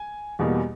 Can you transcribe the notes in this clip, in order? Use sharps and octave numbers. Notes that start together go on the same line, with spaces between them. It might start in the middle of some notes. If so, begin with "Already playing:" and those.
Already playing: G#5
E2 B2 G3 A#3